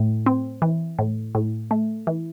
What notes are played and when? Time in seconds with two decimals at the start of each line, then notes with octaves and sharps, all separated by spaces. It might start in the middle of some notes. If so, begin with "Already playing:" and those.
Already playing: A2
0.26 C4
0.62 E3
0.99 A2
1.35 A2
1.71 A3
2.07 E3